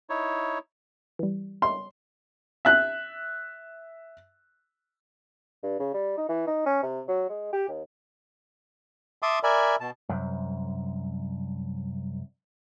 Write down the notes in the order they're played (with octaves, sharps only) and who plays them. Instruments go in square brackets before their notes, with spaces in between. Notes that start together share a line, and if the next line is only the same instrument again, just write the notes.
[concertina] D#4 E4 C#5
[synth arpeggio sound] E3 G3
[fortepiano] C6
[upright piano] E5 F#6
[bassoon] G2
C#3
G3
D#4
E3
D#4
C#4
C3
F#3
G#3
G4
D#2
[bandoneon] E5 A5 C6 D6 D#6
A#4 D5 E5 G#5 B5
B2 A5
[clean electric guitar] C2 F#2